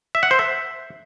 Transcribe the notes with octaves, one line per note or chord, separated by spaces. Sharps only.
E5
F#5
C5
E5